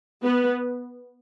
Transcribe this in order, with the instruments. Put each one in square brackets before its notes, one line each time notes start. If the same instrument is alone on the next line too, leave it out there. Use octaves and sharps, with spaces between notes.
[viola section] B3